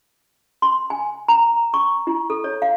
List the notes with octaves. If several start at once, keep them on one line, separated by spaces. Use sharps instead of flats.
C6
G#5
A#5
C#6
E4
A4
C#5
F5